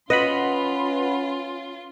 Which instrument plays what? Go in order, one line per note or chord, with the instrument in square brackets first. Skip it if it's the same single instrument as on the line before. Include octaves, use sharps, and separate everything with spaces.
[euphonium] C#4 [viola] F4 C6 [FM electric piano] B4 F#5 B5 [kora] D#5